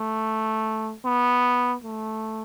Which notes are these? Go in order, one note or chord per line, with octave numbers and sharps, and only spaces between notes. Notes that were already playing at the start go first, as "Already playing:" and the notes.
Already playing: A3
B3
A3